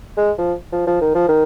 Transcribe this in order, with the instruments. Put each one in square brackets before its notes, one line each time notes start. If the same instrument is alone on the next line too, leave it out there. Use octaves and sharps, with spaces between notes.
[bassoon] G#3
F3
F3
F3
D#3
F3
D#3